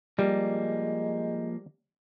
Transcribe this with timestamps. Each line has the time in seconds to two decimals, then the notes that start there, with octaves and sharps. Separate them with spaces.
0.19 F3 G3 G#3 A#3